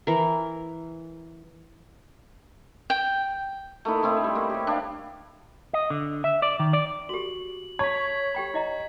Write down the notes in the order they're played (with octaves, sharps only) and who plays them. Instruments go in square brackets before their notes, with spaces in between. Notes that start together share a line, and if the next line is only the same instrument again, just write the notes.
[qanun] E3 A#4
[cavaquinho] G5
[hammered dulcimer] A3 A#3 D#4 E4
A3 C4 D#4 E4
G3
A#3
G4 C#5
D4 F5
[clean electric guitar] D#5
D3
E5
D5
D#3
D5
[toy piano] F#4 G4 [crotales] F#7
[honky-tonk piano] C#5 [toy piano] A5 [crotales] G#6 B6
[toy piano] G4 G5 B5
E4 D#5 A#5